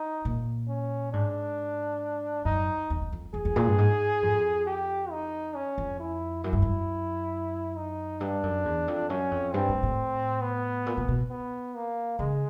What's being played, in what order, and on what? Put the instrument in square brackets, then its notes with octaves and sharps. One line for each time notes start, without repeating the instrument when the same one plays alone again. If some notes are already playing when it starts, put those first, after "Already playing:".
Already playing: [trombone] D#4
[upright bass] A#2
[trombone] C#4
[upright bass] G#2 [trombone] D4
[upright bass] F#2 [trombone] D#4
[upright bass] E2
E2
F2
[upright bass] F2 [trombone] G#4
[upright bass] F2
A#2
G2
G#2
F2
[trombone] G4
D#4
C#4
[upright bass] F2
[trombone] E4
[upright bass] F#2 [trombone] E4
[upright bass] G2
F#2
[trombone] D#4
[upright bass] G2 [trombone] D4
[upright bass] F#2
E2
F2
[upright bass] F#2 [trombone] C#4
[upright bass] F2
[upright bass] G2 [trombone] C4
[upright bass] A2
A2
[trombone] B3
[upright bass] A#2
A#2
B2
[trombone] B3
A#3
[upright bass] C#3 [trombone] G#3